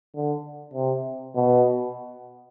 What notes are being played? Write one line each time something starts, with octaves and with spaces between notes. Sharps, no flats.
D3
C3
B2